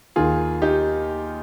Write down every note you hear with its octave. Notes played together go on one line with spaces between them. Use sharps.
D#2 D#3 F4 G#4
D#4 G4